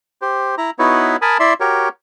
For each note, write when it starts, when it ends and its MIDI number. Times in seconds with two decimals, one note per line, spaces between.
0.22 0.55 67
0.22 0.55 72
0.58 0.71 64
0.58 0.71 82
0.79 1.17 59
0.79 1.17 63
0.79 1.17 64
0.79 1.17 66
0.79 1.17 71
0.79 1.17 73
1.22 1.38 70
1.22 1.38 80
1.22 1.38 81
1.22 1.38 83
1.22 1.38 87
1.40 1.53 64
1.40 1.53 74
1.40 1.53 76
1.40 1.53 84
1.60 1.89 66
1.60 1.89 67
1.60 1.89 70
1.60 1.89 73